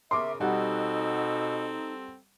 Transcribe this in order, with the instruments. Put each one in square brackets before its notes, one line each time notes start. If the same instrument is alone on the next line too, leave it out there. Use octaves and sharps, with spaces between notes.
[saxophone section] C#3 A#4 [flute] E5 [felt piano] C6 D6
[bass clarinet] B2 [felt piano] G3 F#5 [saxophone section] C4 A4 [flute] D#4